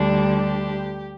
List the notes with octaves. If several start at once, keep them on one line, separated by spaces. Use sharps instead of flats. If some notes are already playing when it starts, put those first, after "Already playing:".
Already playing: D2 D3 G3 D4
G4